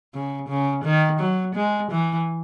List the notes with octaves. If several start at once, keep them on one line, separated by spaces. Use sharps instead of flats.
C#3
C#3
D#3
F#3
G#3
E3